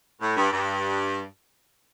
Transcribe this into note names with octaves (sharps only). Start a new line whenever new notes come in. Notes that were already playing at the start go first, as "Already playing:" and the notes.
A2
G2
G2